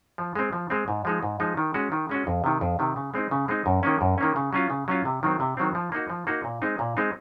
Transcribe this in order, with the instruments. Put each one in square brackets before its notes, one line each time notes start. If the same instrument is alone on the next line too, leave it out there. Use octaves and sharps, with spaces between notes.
[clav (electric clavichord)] F3
G#3 C4
F3
G#3 C4
G#2
F3 G#3 D#4
G#2
F3 G#3 D#4
D#3
G#3 C#4 F#4
D#3
G#3 C#4 F#4
F2
C3 D#3
F2
C3 D#3
C#3
G#3 C4 D#4
C#3
G#3 C4 D#4
F#2
D#3 A#3 C#4
F#2
D#3 A#3 C#4
C#3
F#3 C#4 F4
C#3
F#3 C#4 F4
C3
D#3 F#3 C4
C3
D#3 F#3 C4
F3
A#3 D#4 F#4
F3
A#3 D#4 F#4
A#2
G#3 C4 D#4
A#2
G#3 C4 D#4